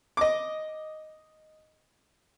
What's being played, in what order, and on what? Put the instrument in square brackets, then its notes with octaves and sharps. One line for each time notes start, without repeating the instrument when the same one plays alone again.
[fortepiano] D#5 D6